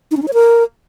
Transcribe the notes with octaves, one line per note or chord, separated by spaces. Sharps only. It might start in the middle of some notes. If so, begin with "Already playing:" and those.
D#4
C#4
D#4
C#5
A#4